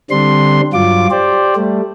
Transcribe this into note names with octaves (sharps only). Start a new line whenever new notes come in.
D3 G3 C4 D4 C6
G2 F#3 F4 D6
G4 C5 D5
G3 A3